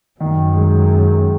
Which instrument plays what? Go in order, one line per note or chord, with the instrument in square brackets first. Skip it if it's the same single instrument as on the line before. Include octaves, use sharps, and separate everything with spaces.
[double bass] F#2 [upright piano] D#3
[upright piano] G#3